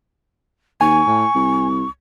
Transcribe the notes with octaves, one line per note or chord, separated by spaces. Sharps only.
D#2 G#5 C#6
A2
C2